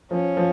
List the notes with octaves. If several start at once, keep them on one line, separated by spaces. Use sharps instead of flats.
F3 C#4
F3